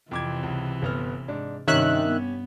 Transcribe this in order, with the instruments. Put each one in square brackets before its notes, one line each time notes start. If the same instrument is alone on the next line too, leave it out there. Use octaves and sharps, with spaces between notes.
[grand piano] F2 D6 G#6 [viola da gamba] C3 E3
[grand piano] C#2
G1 B3 F6
G#2 D4
[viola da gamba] G2 C3 [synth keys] D#3 E5 F#6 [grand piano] C#4 G4 C#5
[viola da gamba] B3